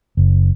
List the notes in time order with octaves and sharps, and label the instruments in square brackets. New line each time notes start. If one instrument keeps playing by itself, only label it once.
[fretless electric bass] F#1